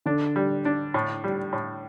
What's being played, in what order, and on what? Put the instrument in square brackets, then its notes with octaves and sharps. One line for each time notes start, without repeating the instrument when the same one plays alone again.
[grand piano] D3 [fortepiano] D4
[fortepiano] G3
D4
A2
G3
A2